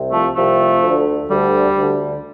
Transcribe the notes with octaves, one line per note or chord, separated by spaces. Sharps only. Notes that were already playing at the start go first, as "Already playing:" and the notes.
Already playing: C2 C3
F3 A3
C2 C3 F3 A3
D2 D3
D2 D3 G3
D2 D3